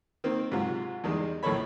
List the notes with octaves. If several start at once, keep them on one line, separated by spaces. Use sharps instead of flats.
D#3 A#3 C4
G#2 C3 F#3 F4 G4
E2 D#3 G3 G#3
A#1 A2 A#3 A4 C#5 B5